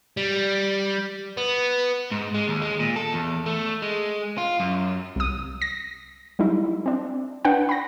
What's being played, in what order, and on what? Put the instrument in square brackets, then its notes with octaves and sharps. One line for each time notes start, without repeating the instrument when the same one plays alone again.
[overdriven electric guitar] G3
B3
G#2
G#3
D#2
G#3
A#2
A4
E2
A3
G#3
F4
F#2
[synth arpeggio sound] C2 D#6
A#6
F#3 G3 D#4 E4
C4 D4
D4 B4 F#5 G5
B5 A#6